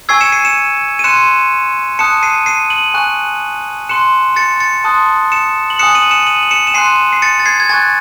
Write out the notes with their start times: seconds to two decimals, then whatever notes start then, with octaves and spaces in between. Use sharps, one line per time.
0.09 G#5 C#6 E6 G#6 C7
0.21 C#7 E7
0.32 C7 D#7
0.44 C#7 E7
0.99 D#7
1.04 C6 F#6 C#7 E7
1.99 A5 D#6 F#6 C#7 E7
2.23 C7 D#7
2.46 C7 D#7
2.70 D#7 F#7
2.94 G#5 C#6 F#6
3.89 C6 F#6 C#7 E7
4.36 A6 C#7
4.60 A6 C#7
4.84 A5 C6 D#6 F#6
5.32 C#7 E7
5.70 F#7
5.79 G#5 D#6 F#6 C#7 E7
5.95 D#7 F#7
6.11 C#7 E7
6.27 D#7 F#7
6.43 F#7
6.51 C#7 E7
6.67 E7
6.74 G#5 C6 F#6 C7 D#7
7.13 C7
7.22 A6 C#7
7.40 A6
7.46 G#6 C7
7.60 G#6
7.69 G#5 C#6 F#6 A6